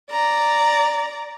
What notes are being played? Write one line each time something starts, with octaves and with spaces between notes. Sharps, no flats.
D5 A#5